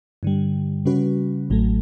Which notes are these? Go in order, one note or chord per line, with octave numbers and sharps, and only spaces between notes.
G2 D3 G3
C#3 G3 C#4 F#4 B4
A1 A2 F#3 A3